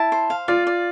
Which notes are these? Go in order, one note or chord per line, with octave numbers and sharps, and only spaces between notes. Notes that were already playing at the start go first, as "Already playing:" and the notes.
Already playing: E4 A5
C5
F5
F4 D5
D5